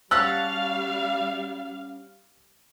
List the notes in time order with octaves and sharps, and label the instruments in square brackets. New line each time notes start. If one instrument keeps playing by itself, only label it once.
[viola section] G3 F5 [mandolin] C#4 F#5 A5 [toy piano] E6 [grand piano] F#6